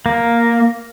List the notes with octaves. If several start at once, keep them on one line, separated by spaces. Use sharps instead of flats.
A#3